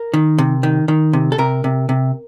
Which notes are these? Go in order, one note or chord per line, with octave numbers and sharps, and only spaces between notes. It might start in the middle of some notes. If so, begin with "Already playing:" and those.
Already playing: A#4
D#3
C3
D#3
D#3
C3
A4
C3 A#4
C3
C3